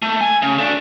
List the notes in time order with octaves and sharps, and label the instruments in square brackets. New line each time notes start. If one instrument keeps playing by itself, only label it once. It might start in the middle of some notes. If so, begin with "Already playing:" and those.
[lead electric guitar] A3
G#5
C#3
A3 D4